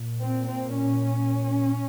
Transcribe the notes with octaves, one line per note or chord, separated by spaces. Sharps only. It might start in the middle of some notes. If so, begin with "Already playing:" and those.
Already playing: A#2
C4
C4
C#4